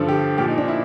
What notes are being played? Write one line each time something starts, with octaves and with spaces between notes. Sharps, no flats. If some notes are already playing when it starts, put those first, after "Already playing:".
Already playing: G2 D3 F3 A4
G4
A#2 F3 G4
D#4
D4
E4